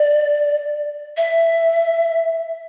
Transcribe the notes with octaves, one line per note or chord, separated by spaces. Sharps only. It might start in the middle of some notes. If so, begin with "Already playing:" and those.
Already playing: D5
E5